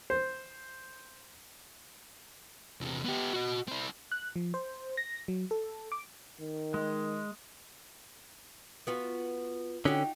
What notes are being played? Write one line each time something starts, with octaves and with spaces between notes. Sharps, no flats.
C5
E2 C3
B3 G4
F#4 D#5
C4 E4
F#6
F3
C5
A#6
F#3
A4
D6
D#3
G#3
B3 F4 F#4
D3 C#4 D#4 F#4 G4